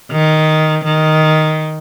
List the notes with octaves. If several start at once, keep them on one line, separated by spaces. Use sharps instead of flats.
D#3
D#3